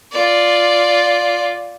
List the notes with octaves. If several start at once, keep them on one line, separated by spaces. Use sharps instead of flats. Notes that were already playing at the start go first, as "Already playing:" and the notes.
F4 D5